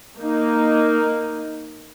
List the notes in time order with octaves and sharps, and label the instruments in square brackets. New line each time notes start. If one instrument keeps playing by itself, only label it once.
[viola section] A#3 D#4